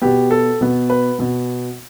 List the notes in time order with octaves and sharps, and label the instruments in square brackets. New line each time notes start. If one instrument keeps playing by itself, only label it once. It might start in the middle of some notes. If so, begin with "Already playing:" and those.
[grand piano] B2 B3 G4
A4
B2 B3
B4
B2 B3